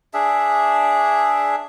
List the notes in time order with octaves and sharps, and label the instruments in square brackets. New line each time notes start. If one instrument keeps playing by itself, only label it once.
[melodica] D4 G#4 E5